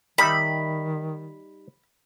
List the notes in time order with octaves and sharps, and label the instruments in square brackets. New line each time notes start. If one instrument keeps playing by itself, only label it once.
[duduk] D#3 [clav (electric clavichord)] G3 D#4 E5 [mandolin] B5